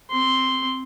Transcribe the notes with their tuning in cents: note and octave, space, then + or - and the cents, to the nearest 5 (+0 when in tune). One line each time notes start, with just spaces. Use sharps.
C4 +0 C6 +0